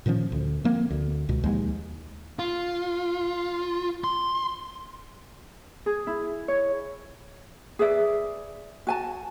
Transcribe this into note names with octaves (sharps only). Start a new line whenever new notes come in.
A#2 D#3 F3 C#4
D2
F3 A#3 C4
D2
C#2 B2
D#2 F3 G#3
F4
C6
G#4
E4
C#5
G#4 B4 D5 E5
F#4 G#5 A5